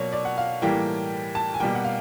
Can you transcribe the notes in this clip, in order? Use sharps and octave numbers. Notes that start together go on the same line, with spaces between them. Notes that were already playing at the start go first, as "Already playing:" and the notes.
Already playing: B2 F#3 A#3 C#5 D5
D5
F#5
F5
A2 E3 G3 A#3 G5
A5
G#5
B2 G3 A#3 G5
F#5
F5